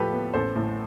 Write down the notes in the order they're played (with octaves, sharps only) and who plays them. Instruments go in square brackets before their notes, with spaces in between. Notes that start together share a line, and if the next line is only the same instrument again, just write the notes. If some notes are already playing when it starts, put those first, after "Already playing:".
Already playing: [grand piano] A2 F3 G4 A4 B4
B3
A1 A4 C5
A2